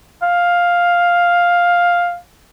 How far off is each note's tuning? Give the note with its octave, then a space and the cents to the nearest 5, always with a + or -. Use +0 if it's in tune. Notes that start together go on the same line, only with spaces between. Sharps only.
F5 +5